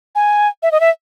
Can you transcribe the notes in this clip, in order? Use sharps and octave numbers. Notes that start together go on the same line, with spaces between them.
G#5
E5
D#5
E5